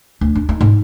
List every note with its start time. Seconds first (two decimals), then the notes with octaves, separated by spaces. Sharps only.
0.21 D2
0.35 D4
0.49 D#4
0.61 G#2